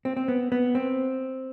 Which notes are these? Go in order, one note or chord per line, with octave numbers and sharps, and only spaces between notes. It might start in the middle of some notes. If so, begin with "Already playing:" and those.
C4
C4
B3
B3
C4